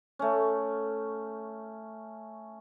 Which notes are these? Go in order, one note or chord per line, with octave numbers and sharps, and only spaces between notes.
A3 C#4